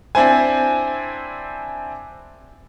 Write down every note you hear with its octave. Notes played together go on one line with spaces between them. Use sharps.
C4 D4 E4 C5 G#5